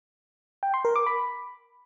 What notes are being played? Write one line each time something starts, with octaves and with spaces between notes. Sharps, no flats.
G5
C6
A#4
D6
B5